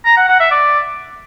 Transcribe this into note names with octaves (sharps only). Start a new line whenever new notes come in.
A#5
F#5
F#5
E5
D5